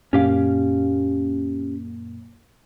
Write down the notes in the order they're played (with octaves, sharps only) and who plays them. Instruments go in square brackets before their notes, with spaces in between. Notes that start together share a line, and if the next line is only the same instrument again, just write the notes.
[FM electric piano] F#2 A#2 A#3 [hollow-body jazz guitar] C#4 G4 F5